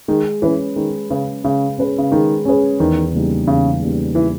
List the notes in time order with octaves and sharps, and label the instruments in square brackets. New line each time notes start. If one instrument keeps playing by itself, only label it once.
[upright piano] D#3 [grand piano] G#3
[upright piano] E3 [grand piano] C#4 G#4 B4
[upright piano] D#3 [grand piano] G#3
[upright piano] C#3 [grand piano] C#4 G#4 B4
[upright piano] C#3 [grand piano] G#3
[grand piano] C#4 G#4 B4
[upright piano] C#3
[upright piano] D#3 [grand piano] G#3
[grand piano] C#4 G#4 B4
[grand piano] E2 [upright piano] D#3
[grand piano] C#3 G3 A#3 D#4
[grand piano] E2 [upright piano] C#3
[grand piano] C#3 G3 A#3 D#4
[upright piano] E3